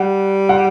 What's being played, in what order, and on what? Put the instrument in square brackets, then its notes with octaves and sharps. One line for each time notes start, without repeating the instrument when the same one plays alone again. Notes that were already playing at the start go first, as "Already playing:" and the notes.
Already playing: [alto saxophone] G3 [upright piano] F#5
[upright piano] F#5